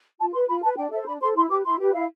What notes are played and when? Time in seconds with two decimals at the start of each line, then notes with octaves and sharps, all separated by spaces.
0.19 F4 A5
0.33 B4 C6
0.49 F4 B5
0.63 B4 A5
0.77 D4 G5
0.92 A4 E5
0.95 C5
1.07 D4 B5
1.21 A4 C5 C6
1.36 E4 C6
1.50 G4 B4 D6
1.65 E4 C6
1.79 G4 B4
1.94 E4 F5